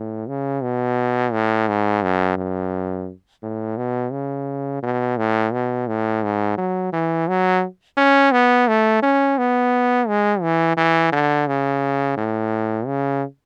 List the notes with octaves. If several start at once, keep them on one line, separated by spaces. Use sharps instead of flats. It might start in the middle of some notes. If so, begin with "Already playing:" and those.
Already playing: A2
C#3
B2
A2
G#2
F#2
F#2
A2
B2
C#3
B2
A2
B2
A2
G#2
F#3
E3
F#3
C#4
B3
A3
C#4
B3
G#3
E3
E3
D3
C#3
A2
C#3